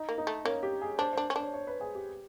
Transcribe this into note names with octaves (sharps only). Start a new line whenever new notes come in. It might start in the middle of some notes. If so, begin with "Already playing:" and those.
Already playing: D#4
A#3
D#4
A3
A#3 C#4
G4
G#4
D4 C5
D4 C5
C#4
D4 C#5
C#5
B4
G#4
G4